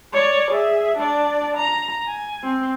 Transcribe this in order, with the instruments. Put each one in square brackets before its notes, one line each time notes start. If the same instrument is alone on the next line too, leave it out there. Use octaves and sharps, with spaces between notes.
[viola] C#5 D5
G#4 E5
D4 D5
A#5
G#5
C4